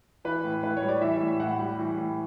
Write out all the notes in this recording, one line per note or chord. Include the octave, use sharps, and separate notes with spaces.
E3 B4
A2
A2 B4
C#5
G3
D5
E3 E5
A2
A2 F#5
G3
E3
A2